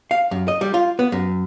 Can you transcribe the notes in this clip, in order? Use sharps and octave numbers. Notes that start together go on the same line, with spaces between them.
F5
F#2
D#5
G3
F4
B3
F#2